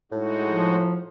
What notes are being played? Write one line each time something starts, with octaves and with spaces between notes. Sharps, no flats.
A2 G#3 D#4 F#4
F3